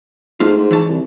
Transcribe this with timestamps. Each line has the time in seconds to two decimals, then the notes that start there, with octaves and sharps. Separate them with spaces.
0.40 G#2 A3 F4
0.57 G#2
0.71 E3 C#5 A5
0.89 C2